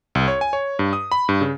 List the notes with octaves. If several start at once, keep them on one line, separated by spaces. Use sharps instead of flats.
C2
C#5
G#5
C#5
G2
D#6
B5
G2
C#3